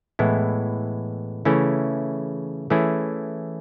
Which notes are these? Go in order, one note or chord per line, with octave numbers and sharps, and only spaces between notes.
A2 E3 G#3 B3 E4
C#3 E3 A3 C#4 E4
E3 A3 C#4 E4 G#4